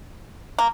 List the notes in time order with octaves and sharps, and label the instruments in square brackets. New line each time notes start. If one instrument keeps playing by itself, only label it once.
[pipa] A#3